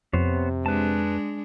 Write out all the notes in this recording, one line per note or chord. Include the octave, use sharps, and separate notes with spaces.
F2 C3 B3 C5 C#5
G#3 D4 B4 A5